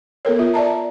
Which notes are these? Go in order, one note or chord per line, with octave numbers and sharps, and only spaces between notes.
B3 A4 A#4 C#5
F4 E5
D5 E5 A5 A#5